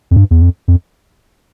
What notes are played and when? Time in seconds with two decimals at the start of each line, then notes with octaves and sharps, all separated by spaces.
0.11 F2
0.16 G2
0.31 E2
0.41 F2
0.68 F2